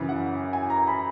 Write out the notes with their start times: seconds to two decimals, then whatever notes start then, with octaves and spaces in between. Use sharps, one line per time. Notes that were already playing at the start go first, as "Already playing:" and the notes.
Already playing: F#2 C#3 E3
0.09 F#5
0.53 G#5
0.70 A#5
0.87 B5